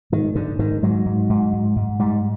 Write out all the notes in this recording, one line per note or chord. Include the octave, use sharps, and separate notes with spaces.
G#2 D#3
G#2 D3
G#2 D#3
G#2 F#3
G#2
G#2
G#2
G#2
G#2 G3